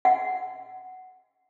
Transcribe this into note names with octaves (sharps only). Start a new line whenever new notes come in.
F#5